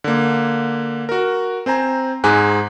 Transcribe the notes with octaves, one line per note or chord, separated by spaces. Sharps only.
D3 A#3
F#4 A#4
C4 C5 G#5 A#5
G#2 G#3 G#4 G#5 A#5 F#6